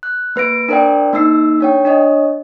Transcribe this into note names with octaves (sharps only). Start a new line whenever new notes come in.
F#6
A#3 B4 A#6 D7
D4 A#4 C5 D5 G5
A#3 D#4 E6 C7
D4 C#5 G5
D4 C#5 D#5